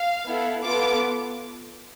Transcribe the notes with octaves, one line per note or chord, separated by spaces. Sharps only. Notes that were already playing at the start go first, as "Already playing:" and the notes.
Already playing: F5
B3 E4 A4
B3 F4 A4 D6